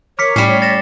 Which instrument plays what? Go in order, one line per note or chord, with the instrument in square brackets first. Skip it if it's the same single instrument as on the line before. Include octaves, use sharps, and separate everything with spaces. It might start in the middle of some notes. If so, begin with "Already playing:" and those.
[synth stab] A#4 [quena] C#5 [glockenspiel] D6 B6 C#7
[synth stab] A2 [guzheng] G3 C#4 [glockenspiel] C7 C#7
[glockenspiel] A6 A#6 E7